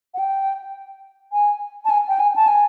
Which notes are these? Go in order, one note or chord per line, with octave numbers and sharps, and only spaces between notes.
F#5
G5
G#5
A5
G#5
G5
G#5
A5
G#5